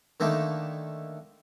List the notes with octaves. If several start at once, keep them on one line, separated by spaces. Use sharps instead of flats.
D3 D#3 A3 A#3